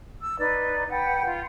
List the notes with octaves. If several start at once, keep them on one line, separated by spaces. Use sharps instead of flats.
E6
D#4 B4 D5
B4 F#5 G5
F4